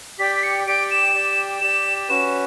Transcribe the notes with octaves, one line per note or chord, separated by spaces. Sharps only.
G4 D5 G5 B6
B6
C#7
G4 D5 G5 D7
E7
G4 D5 G5
G4 D5 G5 E7
C#4 F#4 B4 E7